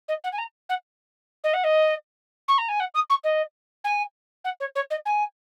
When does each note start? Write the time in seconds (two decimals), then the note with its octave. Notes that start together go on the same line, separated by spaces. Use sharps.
0.08 D#5
0.24 F#5
0.32 G#5
0.38 A#5
0.69 F#5
1.44 D#5
1.53 F#5
1.64 D#5
2.48 C#6
2.58 A#5
2.68 G#5
2.80 F#5
2.94 D#6
3.09 C#6
3.24 D#5
3.84 G#5
4.44 F#5
4.60 C#5
4.75 C#5
4.90 D#5
5.05 G#5